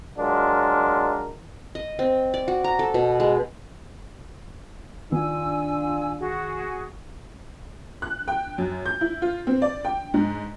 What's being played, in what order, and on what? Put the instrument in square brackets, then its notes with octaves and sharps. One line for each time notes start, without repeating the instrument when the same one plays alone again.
[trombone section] F#3 G#3 D4 F4 A#4
[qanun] D#5
C4
D5
F#4
A#5
A4
B2
G#3
[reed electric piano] D#3 B3 [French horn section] D4 F4 [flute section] G#5 E6
[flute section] F#4 G#4
[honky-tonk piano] F#6
G5
F#2
G6
E4
F4
C4
D5
G5
G#2